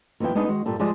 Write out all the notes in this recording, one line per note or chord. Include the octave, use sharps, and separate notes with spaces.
D#2 F3 B3 E4 G5
G#3 B3 D4 D#4 G#4
D#3 G#3 F#4
G2 A#2 G3 A4
F3 G3 G#3 G#4 D5